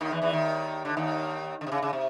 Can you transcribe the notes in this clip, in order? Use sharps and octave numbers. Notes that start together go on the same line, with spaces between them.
D#2 D#3
E2 E3
E2 E3
D#2 D#3
D3
D#2 D#3
D3
C3
C#3
C#3
C3